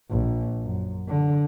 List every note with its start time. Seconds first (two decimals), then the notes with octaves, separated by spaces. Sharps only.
0.10 A#1
0.62 F#2
1.08 D3